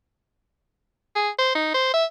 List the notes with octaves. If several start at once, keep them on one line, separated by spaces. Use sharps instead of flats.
G#4
C5
D#4
C5
E5